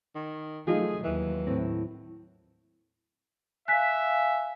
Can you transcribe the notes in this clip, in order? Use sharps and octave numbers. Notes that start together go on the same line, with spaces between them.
D#3
F3 F#3 A3 D#4 F4 G#4
D#2 E3 F#3
A2 C4
E5 F5 G#5 F#6 B6